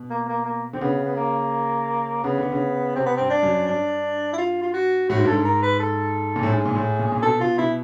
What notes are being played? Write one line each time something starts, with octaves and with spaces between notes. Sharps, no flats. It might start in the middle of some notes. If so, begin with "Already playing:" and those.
Already playing: B2
A#3
A#3
A#3
D3 C4
C#3 B3
B3
A#3
C#3 B3
D3
C#3
C3 C4
B3
G2 C4
D4
F#2
G2 D4
E4
F4
F4
F#4
A2 F#4
G#2
G2 A4
G#2
A#4
B4
A4
A#2
A2
G#2 G#4
A#2
A2
A#2
A#2
B2 A4
B2 F4
B2 E4